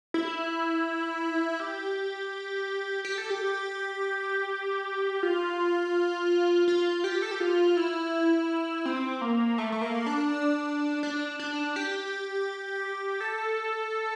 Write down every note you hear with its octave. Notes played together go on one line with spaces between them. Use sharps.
E4
G4
G4
A4
G4
F4
F4
G4
A4
G4
F4
E4
C4
A#3
A3
A3
A#3
D4
D4
D4
G4
A4